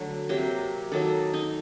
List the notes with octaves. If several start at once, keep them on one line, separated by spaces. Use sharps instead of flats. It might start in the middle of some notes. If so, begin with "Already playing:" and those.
Already playing: D3 F#3 A3
C3 F#3 A#3 G4
D#3 F#3 A#3 A4
D#4